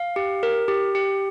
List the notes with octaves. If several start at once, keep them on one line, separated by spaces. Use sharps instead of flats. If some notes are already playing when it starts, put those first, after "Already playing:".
Already playing: F5
G4
A#4
G4
G4